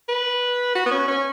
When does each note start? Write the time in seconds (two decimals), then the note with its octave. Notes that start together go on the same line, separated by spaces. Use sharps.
0.09 B4
0.75 F#4
0.86 B3
0.91 C#4
1.08 C#4